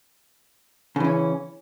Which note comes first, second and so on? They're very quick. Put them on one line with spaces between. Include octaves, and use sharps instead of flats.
C#3 E3 C#4